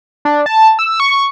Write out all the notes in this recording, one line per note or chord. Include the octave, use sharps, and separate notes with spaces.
D4
A5
E6
C#6